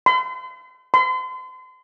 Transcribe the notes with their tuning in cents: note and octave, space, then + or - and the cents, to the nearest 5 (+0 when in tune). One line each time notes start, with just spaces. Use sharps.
C6 -45
C6 -40